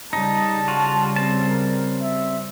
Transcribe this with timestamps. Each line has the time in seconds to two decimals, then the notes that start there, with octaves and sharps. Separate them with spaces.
0.13 C#3 G3 D#4 A5
0.68 F4 F#4
1.16 C4 A5
1.49 A#4
2.01 E5